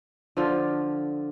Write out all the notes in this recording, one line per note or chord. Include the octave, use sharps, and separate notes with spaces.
D3 F3 F4